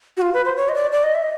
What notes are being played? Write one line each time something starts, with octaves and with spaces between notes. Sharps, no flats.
F#4
F4
B4
C5
C#5
D#5
D5
D5
D#5
E5
D#5